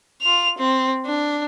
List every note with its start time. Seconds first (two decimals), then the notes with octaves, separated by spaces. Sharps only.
0.22 F4 F7
0.58 C4
1.05 D4